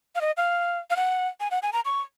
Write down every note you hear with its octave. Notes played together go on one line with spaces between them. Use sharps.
F5
D#5
F5
F5
F#5
G#5
F#5
G#5
A#5
C#6